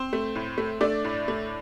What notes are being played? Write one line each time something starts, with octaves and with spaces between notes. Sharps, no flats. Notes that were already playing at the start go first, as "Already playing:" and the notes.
Already playing: C4 C5
A3
A2
A3
A3 D4 D5
A2
A3